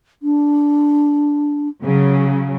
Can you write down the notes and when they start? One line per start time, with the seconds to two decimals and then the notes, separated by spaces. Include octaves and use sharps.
0.23 D4
1.83 C#3 F#3